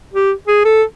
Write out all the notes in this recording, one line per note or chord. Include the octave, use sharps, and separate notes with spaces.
G4
G#4
A4